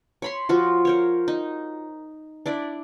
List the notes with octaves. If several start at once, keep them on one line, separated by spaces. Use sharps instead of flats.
C#5 B5 C6
F3 F4 F#4
A#4 C5 C#5
D#4
D4 E4 D5